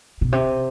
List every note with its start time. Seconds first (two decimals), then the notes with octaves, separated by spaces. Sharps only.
0.21 B2
0.32 C3